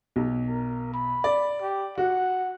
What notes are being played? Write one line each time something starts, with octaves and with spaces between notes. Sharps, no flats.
B1
A#4
B5
D5
G4
F#4 F#5